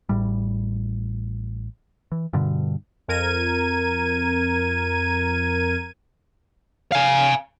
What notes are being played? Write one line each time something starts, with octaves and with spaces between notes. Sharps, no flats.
A1 A2 G3
E3
G2 B2 D3
F2 A#4 G#6 D#7
F5 G#5